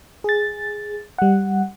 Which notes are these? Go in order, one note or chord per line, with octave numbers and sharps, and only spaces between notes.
G#4 A6
G3 F#5